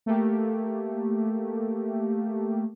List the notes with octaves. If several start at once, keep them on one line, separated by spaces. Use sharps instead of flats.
A3 A#3 G4